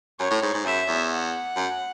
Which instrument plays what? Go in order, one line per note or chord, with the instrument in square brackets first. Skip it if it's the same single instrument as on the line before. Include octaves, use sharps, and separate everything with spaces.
[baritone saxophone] F#2 [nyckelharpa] C#5
[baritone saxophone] A2
G#2
G#2
[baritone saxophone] F#2 [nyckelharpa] E5
[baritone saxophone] E2
[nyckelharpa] F#5
[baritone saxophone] F#2